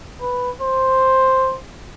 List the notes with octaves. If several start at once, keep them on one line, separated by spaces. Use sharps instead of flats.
B4
C5